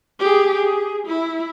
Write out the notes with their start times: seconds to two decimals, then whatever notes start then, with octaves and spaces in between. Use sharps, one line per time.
0.19 G4 G#4
0.55 G#4
1.07 E4